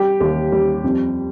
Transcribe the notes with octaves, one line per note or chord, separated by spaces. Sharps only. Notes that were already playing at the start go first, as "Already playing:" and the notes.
Already playing: G3 G4
D#2
G3
F2